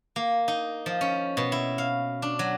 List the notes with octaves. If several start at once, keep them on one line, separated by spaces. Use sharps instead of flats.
A#3
D#4
F3
C#4
B2
E4
F5
D4
F#3